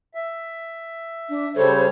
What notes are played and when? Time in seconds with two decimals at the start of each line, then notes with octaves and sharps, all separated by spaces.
0.15 E5
1.29 D4
1.56 C#3 G3 A4 C5 C#5